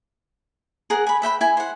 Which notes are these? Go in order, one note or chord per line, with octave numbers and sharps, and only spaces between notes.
G#4 A#4 F#5
G#5 B5
B4 E5 G5 B5
E4 G#5
C5 F#5